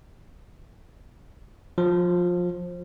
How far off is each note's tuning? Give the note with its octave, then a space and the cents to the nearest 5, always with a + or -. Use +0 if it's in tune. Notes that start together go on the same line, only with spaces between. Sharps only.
F3 +20